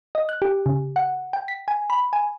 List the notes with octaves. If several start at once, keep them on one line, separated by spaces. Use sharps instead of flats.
D#5
F#6
G4
C#3
F#5
G5
B6
G#5
B5
G#5